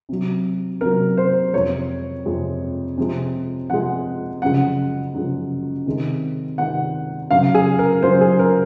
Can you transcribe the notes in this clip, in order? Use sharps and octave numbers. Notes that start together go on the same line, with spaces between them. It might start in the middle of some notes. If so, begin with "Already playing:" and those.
C3 F#3
C3 F#3 A#4
C5
F2 C3 F3 G#3 C#5
F2 C3 F3 G#3
C3 F3 G#3
C3 F3 G#3 F#5
F#2 C#3 F3 G#3 F#5
F#2 C#3 F3 G#3
C3 D#3 G#3
C3 D#3 G#3 F#5
F#2 C#3 F#3 F5
G#4
A#4
F#2 C#3 F#3 C5
G#4
A#4